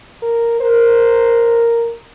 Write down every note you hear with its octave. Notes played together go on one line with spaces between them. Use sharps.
A#4
A#4 C5